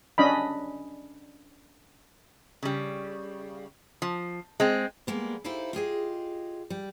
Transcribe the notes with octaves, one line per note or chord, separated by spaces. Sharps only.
C#4 D4 D#5 B5
C#3 G3
F3
G#3 C4
G3 G#3 A#3 B3
D#4 E4 G4 A4 C5 F5
F4 G4 G#4 D#5
G3